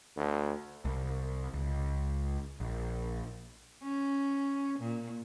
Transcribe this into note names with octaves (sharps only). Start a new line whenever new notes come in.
D2
C2
C#2
A#1
C#4
A#2